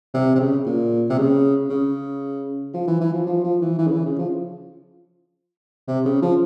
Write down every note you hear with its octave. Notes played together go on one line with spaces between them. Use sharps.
C3
C3
C#3
A#2
C3
C#3
C#3
F3
E3
E3
F3
F3
F3
E3
E3
C#3
E3
C#3
F3
C3
C#3
F3